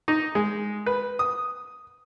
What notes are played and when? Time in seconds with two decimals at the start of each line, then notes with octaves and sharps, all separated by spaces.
0.08 D#4
0.35 G#3
0.86 B4
1.19 D#6